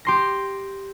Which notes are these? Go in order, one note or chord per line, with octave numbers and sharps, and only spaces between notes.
G4 C6 A#6